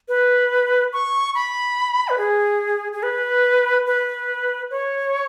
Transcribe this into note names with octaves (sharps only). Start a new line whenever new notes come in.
B4
C#6
B5
B4
G#4
G#4
B4
B4
C#5